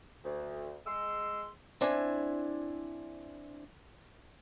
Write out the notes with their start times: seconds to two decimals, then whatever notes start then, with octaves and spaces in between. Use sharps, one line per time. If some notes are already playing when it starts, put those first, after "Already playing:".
0.24 D2
0.86 G#3 C6 E6
1.81 C4 D4 E4 G#5